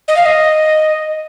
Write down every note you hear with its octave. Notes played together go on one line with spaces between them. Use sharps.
D#5
F5
D#5